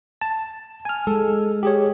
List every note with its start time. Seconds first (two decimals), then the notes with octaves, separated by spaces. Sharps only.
0.21 A5
0.85 G#5 F6
1.07 G#3 A4
1.63 G4 G#4 C#5